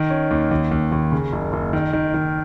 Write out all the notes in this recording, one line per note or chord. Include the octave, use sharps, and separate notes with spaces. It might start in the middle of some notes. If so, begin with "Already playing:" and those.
Already playing: D#3
C#4
D#2
D#2
D#2
D#2
C#3
F#1
F#1
D#3
D#3
D#3